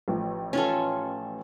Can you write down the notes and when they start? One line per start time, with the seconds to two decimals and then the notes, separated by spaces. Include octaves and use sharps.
0.08 A1 F3 A3
0.53 C#4 F4 A4